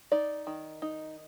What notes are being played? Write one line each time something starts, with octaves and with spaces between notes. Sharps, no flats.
D#4 D5
D#3
D#4